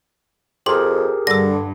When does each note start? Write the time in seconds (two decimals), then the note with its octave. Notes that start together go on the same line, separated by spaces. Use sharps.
0.66 F2 G4 G#4 A#4 C6 F#7
1.27 G2 D3 E6 A#6